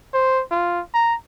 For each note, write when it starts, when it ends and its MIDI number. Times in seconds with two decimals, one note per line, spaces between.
0.14 0.42 72
0.51 0.81 65
0.94 1.15 82